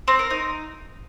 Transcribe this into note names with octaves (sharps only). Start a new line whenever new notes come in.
C4
A#4
D#4